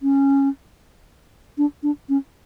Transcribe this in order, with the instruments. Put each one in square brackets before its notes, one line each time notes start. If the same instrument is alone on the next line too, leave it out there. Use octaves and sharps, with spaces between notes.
[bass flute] C#4
D4
D4
C#4